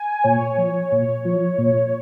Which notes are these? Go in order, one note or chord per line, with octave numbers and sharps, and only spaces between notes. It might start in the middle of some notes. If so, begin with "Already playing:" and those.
Already playing: G#5
A#2 C#5
F3
A#2
F3
A#2